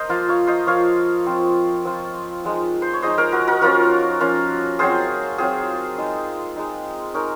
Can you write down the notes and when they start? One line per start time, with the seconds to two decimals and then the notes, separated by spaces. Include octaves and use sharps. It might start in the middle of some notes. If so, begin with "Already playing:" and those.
Already playing: A#4 C5 D#5
0.09 F3 A#3 F4
0.29 C#5 F5
0.47 C5 D#5
0.67 F3 A#3 F4 C#5 F5
1.26 F3 C4 F4
1.85 F3 C4 F4
2.44 F3 G#3 D#4
2.82 C5
2.93 C#5
3.02 F3 G#3 D#4 C5 D#5
3.18 A#4 C#5
3.32 F#4 A#4
3.47 F#4 A#4
3.61 F3 A#3 C#4 F4 F#4 A#4
4.20 F3 A#3 C#4 F4
4.79 F#3 C4 F4 G#4 C5
5.38 F#3 C4 F4 G#4 C5
5.98 G#3 D#4
6.57 G#3 D#4
7.14 G#3 D#4 A#4 C#5